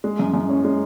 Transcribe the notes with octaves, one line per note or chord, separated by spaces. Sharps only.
G#3
F#2
F#2
C#4
G#3